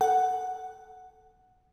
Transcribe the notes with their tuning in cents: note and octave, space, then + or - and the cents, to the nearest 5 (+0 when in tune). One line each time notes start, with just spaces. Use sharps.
A4 -5 F#5 +0